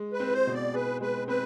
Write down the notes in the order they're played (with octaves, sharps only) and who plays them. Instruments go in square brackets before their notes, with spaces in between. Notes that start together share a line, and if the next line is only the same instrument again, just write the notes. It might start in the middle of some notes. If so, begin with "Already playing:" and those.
Already playing: [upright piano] G#3
[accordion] B4
[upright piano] C4
[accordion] C5
[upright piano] B2
[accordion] D5
[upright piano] G#4 [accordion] B4
[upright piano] G#3 [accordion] B4
[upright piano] C4 [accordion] B4